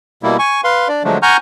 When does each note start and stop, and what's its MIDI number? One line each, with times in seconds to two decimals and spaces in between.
0.23 0.37 47
0.23 0.37 55
0.23 0.37 58
0.23 0.37 64
0.39 0.61 80
0.39 0.61 85
0.64 0.88 71
0.64 0.88 77
0.64 0.88 84
0.88 1.03 62
0.88 1.03 74
1.04 1.18 50
1.04 1.18 53
1.04 1.18 54
1.04 1.18 56
1.04 1.18 57
1.04 1.18 62
1.22 1.37 78
1.22 1.37 80
1.22 1.37 82
1.22 1.37 85
1.22 1.37 89
1.22 1.37 91